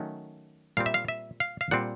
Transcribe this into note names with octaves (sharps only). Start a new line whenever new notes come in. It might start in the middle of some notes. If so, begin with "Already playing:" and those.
Already playing: D#3 F#3 A3 C#4
A#2 G3 C4 F5
E5
F5
E5
F5
F5
A#2 G3 C4 F#5